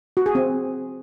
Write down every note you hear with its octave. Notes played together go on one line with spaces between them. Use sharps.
F#4
G#4
C4